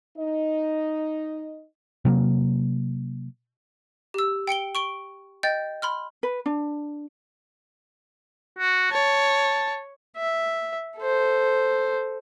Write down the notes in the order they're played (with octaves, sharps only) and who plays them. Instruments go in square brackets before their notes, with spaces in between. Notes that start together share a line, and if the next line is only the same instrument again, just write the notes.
[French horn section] D#4 D#5
[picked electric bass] C3 F#3 A#3
[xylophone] G4 E6
G5 C#7 D7 G7
C#6 D7 G7
D#5 G5 G6 A6
B5 C6 F6
[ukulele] B4
D4
[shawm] F#4
[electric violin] C#5 [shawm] A5
[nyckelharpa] E5
A4 C5